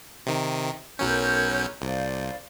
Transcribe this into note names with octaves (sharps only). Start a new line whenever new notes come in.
C3 D#3
B1 F#3 C#4 A#4 C#5 G6
C2 C5 D5 F5